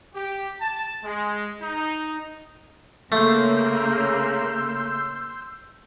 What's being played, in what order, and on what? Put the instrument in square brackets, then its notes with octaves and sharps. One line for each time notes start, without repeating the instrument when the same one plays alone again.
[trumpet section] G4
A5
G#3
D#4
[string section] C#3 A#3 [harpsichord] A3 [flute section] C6 E6 G6